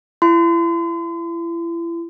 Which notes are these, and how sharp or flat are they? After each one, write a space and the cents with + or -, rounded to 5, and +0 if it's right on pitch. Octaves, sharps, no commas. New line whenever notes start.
E4 +35 C6 -40